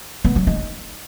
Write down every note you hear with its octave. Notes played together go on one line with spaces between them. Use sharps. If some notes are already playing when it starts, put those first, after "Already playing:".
B3
F#3
D#4